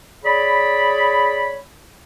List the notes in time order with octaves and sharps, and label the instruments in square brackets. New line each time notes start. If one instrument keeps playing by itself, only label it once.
[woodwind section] G#4 C#5 D5 B5